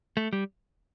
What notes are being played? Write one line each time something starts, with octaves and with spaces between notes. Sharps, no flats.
A3
G3